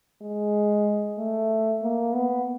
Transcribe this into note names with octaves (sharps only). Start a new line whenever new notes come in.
G#3
A3
A#3
B3